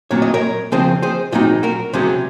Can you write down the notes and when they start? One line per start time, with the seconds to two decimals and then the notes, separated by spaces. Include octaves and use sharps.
0.11 A#2 F#3 C4 C#5
0.22 D#5
0.34 A#4 C#5
0.72 C#3 F3 C4 G#4 C5
1.02 G#4 C5
1.32 A#2 F#3 C4 D#4 F4 G#4
1.63 F#4 A#4
1.93 C3 F#3 C#4 G#4 C5